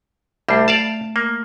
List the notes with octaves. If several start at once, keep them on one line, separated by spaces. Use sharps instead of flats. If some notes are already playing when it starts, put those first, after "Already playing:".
C2 G3 A3 E5
D5 F5 A5
A#3